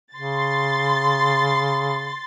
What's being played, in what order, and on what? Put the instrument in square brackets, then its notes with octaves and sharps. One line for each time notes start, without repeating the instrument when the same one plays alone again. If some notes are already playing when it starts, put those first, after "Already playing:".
[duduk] C#3 [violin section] C6 A6